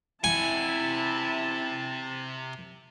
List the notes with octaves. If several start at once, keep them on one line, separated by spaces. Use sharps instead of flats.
C3 E4 F#5 G#5 A5